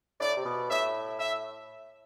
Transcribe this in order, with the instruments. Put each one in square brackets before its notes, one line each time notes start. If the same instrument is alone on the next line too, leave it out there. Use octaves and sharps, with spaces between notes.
[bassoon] A2 [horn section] D5
[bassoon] C3
B2
[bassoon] A2 [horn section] E5
[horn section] E5